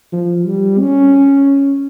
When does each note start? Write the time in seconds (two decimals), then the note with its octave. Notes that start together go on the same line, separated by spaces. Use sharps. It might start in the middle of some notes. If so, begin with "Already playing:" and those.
0.12 F3
0.46 G3
0.80 C#4